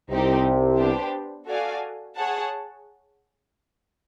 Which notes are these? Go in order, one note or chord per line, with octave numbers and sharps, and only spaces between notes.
C2 C3 C4 D#4 G4
B3 D4 G4 C5
F#4 A4 D5 F5 G#5
G#4 C#5 F#5 A5